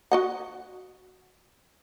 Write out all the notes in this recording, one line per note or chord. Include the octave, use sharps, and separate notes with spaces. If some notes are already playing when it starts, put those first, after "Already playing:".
F#4 D#5 F#5